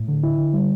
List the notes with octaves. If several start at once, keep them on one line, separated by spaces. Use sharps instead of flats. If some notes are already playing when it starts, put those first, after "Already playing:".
Already playing: A2
D3
E4
D3
G3